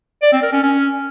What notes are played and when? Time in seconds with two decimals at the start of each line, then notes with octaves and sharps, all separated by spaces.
0.22 D5
0.33 C4
0.43 A#4
0.53 C#4
0.63 C#4